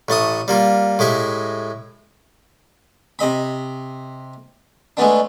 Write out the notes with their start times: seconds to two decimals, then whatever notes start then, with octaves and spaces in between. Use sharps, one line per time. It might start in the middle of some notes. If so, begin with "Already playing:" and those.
0.08 A1 A3 A5 D#6
0.48 G3 A#3 F4
0.99 A2 G#3 G4 E5
3.19 C3 D#5 B5
4.97 G#3 A3 B3 D4